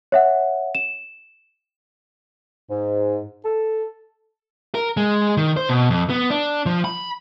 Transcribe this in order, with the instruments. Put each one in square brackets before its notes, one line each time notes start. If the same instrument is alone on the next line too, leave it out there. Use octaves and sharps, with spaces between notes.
[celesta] C#5 E5 F#5
E7
[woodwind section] G#2
A4
[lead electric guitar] A#4
G#3
D#3
C5
B2
F2
B3
D4
F3
B5